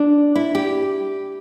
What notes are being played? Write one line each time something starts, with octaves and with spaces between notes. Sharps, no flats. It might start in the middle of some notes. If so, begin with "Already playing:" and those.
Already playing: D4
E4
G4